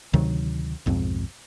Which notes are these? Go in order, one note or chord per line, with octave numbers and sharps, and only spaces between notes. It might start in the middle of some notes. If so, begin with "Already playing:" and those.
D2 C3 D#3 F#3
B1 F2 G#2 C4